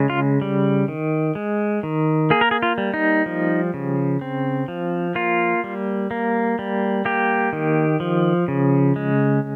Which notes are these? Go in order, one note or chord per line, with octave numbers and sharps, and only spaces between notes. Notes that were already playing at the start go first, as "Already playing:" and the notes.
Already playing: C#3 G#3
F4
G3
D#3
G#3
D#3
A#3 G#4
A#4
G#4
F4
G3
D#4
F3
C#3
C4
F3
A#3 F4
G3
A#3
G3
A#3 G4
D#3
F3
C#3
G#3